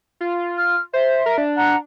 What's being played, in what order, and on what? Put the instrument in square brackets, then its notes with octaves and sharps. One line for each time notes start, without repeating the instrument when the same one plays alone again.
[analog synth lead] F4
[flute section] F6
[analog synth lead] C5 [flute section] E5
[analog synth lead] A#4
D4
[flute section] F#5 A#5 F#6